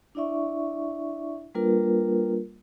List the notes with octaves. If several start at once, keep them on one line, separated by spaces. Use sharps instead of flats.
D4 E4 D5 E5 C#6
G3 A#3 D4 F4 A#4 B4